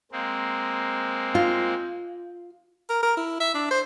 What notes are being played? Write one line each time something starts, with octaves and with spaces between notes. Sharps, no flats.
G#3 A#3 C4
F4
A#4
A#4
E4
E5
D4
C5